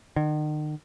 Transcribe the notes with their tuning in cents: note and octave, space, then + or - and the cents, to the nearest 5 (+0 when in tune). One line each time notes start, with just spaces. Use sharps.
D#3 -40